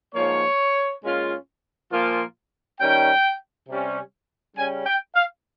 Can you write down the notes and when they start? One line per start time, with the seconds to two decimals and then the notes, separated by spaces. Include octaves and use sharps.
0.15 G#2 F3 A#3 C#5
1.03 A#2 G#3 C#4 F4
1.91 A#2 F3 A#3 F4
2.80 D#3 G3 C#4 G5
3.68 C3 G3 C#4
4.56 C#3 G3 C#4 G#5
4.86 G5
5.15 F5